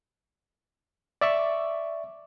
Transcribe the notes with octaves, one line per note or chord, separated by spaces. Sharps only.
D5 E5 C#6 D6